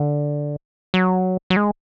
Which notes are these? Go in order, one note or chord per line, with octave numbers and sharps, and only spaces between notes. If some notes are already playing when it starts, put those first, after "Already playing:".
Already playing: D3
F#3
F#3
G#3